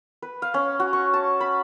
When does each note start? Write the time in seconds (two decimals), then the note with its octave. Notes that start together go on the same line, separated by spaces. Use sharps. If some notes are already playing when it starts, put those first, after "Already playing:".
0.22 B4
0.42 F5
0.54 C#4
0.80 F#4
0.93 C#6
1.14 A5
1.40 B5